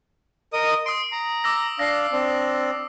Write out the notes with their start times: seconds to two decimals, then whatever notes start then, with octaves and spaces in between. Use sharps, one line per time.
0.53 A#4 D#5 D#6
0.86 C6 D#6 D7
1.12 A#5
1.44 D6 E6 A#6
1.79 D4 F5 A#6 C7
2.12 C4 D4